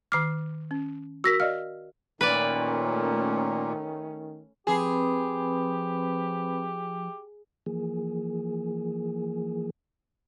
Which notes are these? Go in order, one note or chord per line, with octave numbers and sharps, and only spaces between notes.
D#3 D6 F6 C7
C#4
F#4 A#4 E6 A#6 B6
D5 D#5 F5 F6
A#2 D#3 A3 C#4 B4 D5
F3 C4 G4 G#4 B4 B5
E3 F3 A#3 G#4